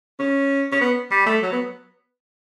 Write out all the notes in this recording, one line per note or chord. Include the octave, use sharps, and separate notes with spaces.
C#4
C#4
B3
G3
A3
F#3
B3